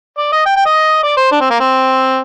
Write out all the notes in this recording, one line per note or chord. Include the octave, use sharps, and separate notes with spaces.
D5
D#5
G5
G5
D#5
D5
C5
D4
C4
A#3
C4